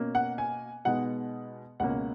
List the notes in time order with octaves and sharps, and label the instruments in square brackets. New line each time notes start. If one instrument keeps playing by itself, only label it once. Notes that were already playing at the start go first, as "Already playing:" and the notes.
Already playing: [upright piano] B2 A#3 C#4
F#5
G#5
B2 G#3 B3 D#4 F#5
C#2 B2 A#3 C#4 F#5